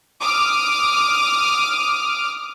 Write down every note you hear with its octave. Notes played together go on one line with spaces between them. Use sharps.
D6 D#6 F6